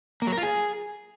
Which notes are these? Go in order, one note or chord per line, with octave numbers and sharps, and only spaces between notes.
A#3
F#3
A#4
F4
G#4